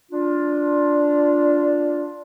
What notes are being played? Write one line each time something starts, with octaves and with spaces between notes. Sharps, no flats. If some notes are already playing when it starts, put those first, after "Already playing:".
D4 F4